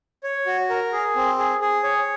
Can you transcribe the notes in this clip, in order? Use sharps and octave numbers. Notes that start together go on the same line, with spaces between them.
C#5
F#4
A#4
G#4
C4
G#4
G#4
C#5